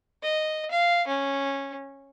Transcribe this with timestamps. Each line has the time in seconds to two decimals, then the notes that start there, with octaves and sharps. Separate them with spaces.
0.23 D#5
0.71 F5
1.07 C#4